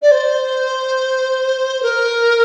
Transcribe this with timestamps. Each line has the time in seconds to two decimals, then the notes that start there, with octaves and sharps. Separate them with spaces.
0.02 D5
0.11 C5
1.82 A#4